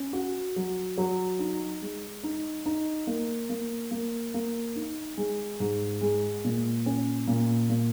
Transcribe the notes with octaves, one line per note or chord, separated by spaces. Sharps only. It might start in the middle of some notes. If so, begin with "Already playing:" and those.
Already playing: C#4
F#4
F#3
F#3
D#4
G#3
D#4
D#4
A#3
A#3
A#3
A#3
D#4
G#3
G#2
G#3
A#2
C#4
A#2
A#2